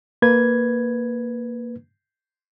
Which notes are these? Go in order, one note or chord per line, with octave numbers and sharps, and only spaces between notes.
A#3 B4 G#6